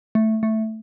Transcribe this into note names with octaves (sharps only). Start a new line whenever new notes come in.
A3
A3